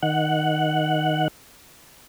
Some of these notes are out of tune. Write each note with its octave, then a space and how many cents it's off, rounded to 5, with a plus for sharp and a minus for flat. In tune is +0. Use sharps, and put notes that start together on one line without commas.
D#3 +0 F#5 +0